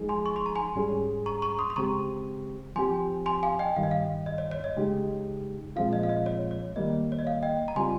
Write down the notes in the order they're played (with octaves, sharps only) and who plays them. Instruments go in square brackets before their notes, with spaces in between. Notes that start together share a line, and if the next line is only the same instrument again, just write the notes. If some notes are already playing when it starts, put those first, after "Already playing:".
Already playing: [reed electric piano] F3 G#3 D#4 G#4
[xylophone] G#5 C6
C#6
C6
A#5
G#5 C6
[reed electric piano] G#2 G3 C#4 G#4
[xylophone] A#5 C#6
A#5 C#6
C6 D#6
C6
[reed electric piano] C#3 G#3 C4 G4 [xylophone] A#5 C#6
[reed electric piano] F3 C4 G4 [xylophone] G#5 C6
[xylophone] G#5 C6
F5 G#5
D#5 G5
[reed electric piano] G2 D#3 G3 [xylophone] F5
[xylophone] D#5
F5
D#5
C#5
C#5
D#5
[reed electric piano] C#3 G#3 D#4 G4
[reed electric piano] A#2 F3 G#3 C4 F4 [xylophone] F5
[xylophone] D#5
F5
D#5
C#5
C#5
[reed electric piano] D#3 G3 A#3 [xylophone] D#5
[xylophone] C#5
D#5
F5
D#5 G5
A#5
[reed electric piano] C#3 G3 C4 F4 [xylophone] G#5 C6